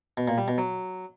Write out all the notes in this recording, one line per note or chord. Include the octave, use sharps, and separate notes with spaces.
B2
A#2
G3
B2
F#3